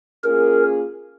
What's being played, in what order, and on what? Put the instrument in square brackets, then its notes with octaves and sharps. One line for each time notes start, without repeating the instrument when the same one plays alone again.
[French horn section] A#3 C#4 F4 G#4 [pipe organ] A#4